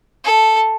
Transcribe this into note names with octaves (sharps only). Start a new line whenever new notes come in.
A4